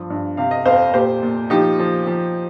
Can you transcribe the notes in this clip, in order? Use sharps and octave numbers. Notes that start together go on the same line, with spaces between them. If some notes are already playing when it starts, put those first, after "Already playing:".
Already playing: G2 F3
G2
C3 F5
D#5
F2 C5 F5
A#2 G4 C5
A#2
F3 D#4 G4
F3
F3